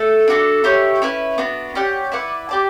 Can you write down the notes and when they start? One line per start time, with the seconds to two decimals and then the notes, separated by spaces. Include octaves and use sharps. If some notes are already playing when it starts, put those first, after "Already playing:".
Already playing: A3 A4
0.28 D4 F#4 A4
0.64 E4 G4 C#5
1.02 C#4 E4 B4
1.38 B3 D4 F#4
1.75 C#4 G4 D5 F#5
2.12 E4 B4 D5 F#5
2.49 G4 D5 A5